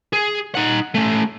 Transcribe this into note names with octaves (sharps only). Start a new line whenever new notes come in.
G#4
D#4 F#5
A3 C#4